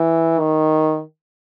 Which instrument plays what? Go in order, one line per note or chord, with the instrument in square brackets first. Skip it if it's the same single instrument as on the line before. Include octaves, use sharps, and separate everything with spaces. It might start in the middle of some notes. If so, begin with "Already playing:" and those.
Already playing: [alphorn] E3
D#3